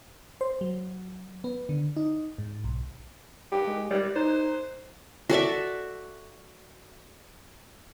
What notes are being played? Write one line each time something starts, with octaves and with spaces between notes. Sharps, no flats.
C5
F#3
B3
D3
D#4
G#2
B1
G4
G#3
G3 G4
D#4 C5
F#4 A4 D5 E5